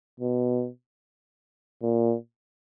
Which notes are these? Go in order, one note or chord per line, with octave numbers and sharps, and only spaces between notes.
B2
A#2